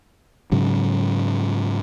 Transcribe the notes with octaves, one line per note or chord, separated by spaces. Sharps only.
G#2 C#3 F#3